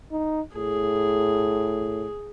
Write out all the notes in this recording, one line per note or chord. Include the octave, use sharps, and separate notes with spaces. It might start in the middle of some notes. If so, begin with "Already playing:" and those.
D#4
A2 G#4